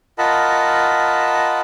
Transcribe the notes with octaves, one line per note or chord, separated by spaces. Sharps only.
F4 A#4 D#5 F#5 A5 B5